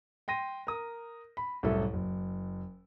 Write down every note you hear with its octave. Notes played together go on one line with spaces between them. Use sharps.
G5 C6 A#6 D#7
A#4 D#6
B5
C2 F#2 A2 A4 E5
F#1